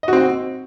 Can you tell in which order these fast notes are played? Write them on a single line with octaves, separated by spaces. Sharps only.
D#5 F#4 C4